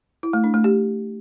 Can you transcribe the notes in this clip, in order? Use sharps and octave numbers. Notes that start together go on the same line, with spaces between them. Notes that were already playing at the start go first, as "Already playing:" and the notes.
E4
A3
D4
A3
G4